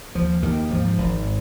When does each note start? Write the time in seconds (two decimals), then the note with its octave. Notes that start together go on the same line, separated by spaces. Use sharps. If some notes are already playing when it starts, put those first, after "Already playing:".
0.15 D#2 F3
0.42 D#2 D#3
0.71 G#2 F3
0.98 G#1